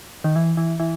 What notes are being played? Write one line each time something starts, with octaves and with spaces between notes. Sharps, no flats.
D#3
E3
E3
E3